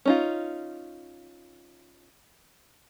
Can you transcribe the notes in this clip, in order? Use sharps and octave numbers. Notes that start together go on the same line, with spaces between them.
C#4 D#4 F4